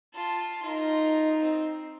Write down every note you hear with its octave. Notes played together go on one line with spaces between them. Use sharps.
F4 A5
D#4 F4 A#4
C4